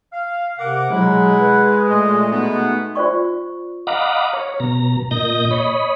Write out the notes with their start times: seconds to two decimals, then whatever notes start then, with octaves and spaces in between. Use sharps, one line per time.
0.12 F5
0.59 C3 A#4 F#5 D6
0.91 B2 F#3 G#3 E4 F#5
1.40 B4
1.89 A#2 A3 D#5
2.31 B2 G#3 B3 D#4
2.95 F4 C5 D5 C#6
3.87 D#5 F5 F#5 A#5 B5 D6
4.33 C#5
4.60 B2 A#5
5.11 A#2 D#5 G6 A#6
5.51 C#5 D#5 B5